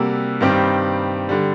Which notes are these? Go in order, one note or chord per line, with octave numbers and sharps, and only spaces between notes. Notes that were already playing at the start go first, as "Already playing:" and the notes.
Already playing: C3 G3 A#3 F#4 A4
G2 D#3 G3 C4 G4
D3 G3